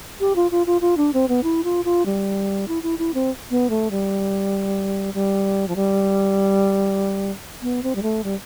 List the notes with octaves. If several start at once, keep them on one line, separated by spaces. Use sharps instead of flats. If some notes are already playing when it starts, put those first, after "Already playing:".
G4
F4
F4
F4
F4
D4
C4
B3
E4
F4
F4
G3
E4
E4
E4
C4
B3
A3
G3
G3
F3
G3
B3
C4
G3
A3
G3